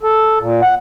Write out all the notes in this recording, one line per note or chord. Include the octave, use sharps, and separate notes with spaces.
A4
A#2
F#5